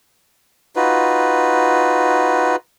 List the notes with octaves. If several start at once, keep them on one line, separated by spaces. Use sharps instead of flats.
D#4 F4 F#4 B4